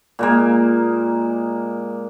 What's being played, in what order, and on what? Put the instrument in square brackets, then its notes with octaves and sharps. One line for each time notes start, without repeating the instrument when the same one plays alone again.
[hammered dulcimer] A#2 G#3 A#3